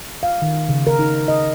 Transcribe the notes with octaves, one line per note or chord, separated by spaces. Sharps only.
F5
D#3
C#3
A#4
D#4
D#5